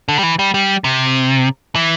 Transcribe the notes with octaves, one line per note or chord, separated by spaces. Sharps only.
D3
G3
E3
G3
G3
C3
E3